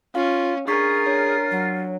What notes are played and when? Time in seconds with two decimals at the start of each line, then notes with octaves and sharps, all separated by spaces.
0.15 C#4 F4 F5
0.68 D4 F4 G#4 A#4 C#6 B6
1.06 D4 C#5
1.51 F#3